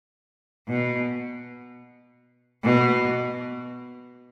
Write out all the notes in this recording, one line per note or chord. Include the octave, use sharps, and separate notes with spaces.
B2
B2